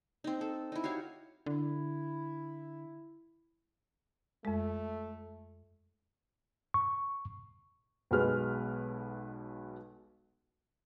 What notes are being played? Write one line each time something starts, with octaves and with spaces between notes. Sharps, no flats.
C4 D#4
A4
D#4 E4
F#4 G4 C#5 F5
D3 E4
F2 G#3 A3
C#6
B1 B2 G#3 B4 F6